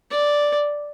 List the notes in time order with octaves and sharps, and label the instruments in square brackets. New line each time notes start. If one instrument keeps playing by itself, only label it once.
[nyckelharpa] D5